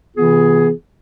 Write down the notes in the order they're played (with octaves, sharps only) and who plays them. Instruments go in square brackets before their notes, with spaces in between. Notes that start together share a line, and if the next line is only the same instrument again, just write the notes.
[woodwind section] C3 E3 B3 F4 G#4